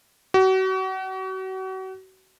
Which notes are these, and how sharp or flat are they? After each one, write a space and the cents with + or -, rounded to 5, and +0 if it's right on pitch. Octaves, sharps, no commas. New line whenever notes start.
F#4 +35